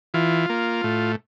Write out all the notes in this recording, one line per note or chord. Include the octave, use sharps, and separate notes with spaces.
E3 F4
A#3
A2